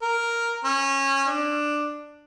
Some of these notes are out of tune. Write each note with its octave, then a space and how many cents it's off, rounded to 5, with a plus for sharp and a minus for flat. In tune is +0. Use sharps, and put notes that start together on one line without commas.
A#4 +0
C#4 -20
D4 +10